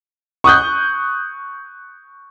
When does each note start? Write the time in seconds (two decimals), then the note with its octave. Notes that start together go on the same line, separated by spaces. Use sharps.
0.44 C#6 D#6 F#6 G6